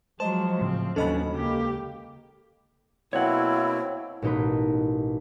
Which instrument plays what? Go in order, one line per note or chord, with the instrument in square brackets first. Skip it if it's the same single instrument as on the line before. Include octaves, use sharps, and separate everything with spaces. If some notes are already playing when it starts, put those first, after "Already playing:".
[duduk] F3 [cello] F#3 G#3 [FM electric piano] C5 D#5 [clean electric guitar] A5
[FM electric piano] A2 [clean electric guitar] C#3 [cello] C4
[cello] D#2 F#3 [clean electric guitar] B3 C#4 D4 [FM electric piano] A4 D#5 B5
[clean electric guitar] C#2 [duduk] A#3 [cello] G4
[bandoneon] B2 A#3 C4 [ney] E4 [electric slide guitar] C#5 F#5
[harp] A1 B2 D#4 A#4 B4